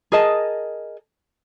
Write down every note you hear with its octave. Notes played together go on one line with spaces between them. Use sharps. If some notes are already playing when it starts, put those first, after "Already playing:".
G#4 A#4 D#5 A5